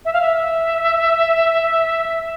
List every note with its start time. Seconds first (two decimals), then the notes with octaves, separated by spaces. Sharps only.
0.05 E5
0.13 F5
0.21 E5